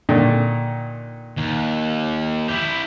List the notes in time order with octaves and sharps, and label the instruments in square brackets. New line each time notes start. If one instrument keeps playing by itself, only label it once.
[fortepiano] A#2 D3 D#3
[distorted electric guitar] D#2
E4 G4